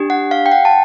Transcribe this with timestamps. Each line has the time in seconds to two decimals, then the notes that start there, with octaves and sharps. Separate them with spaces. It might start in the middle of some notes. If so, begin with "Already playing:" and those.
Already playing: D4 G4
0.10 F#5
0.31 F5
0.46 G5
0.52 F#5
0.65 A5